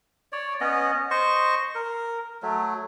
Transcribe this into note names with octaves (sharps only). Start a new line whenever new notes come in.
C#5 D5
B3 C#4 D#5
C5 D#5 C#6
A#4
F#3 A3